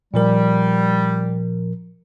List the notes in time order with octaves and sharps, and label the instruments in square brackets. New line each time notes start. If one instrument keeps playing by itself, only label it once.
[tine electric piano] A#2 F3 A#4 [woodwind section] G3